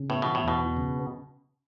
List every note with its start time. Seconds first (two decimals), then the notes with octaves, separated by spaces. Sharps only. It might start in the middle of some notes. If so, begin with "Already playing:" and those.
Already playing: C#3
0.09 A2 B3
0.22 B2 E3
0.35 A2
0.44 E2 B2
0.60 B3
0.77 C#3